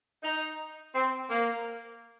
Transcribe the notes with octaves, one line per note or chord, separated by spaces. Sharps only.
D#4
C4
A#3